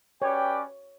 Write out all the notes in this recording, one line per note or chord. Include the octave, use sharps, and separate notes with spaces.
C#4 G4 B4 C#5 D5 G5